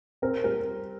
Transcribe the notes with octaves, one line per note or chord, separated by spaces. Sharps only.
C4 A#4
G3 A#4